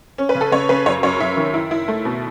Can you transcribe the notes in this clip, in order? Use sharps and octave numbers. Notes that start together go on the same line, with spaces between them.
C#4
B4
C#3
A4
C#3 C#5
C#3 B4
F#2 C#5
F#2 C#5
F#2 E5
D#3
E4
E4
A3
B2